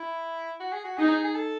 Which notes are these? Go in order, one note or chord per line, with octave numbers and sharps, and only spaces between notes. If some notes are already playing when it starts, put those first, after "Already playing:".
Already playing: E4
F#4
G#4
F#4
D#4 G#4
G#4
A4